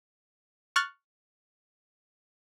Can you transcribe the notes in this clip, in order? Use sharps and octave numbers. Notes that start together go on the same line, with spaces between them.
C#6 F6 F#6 A6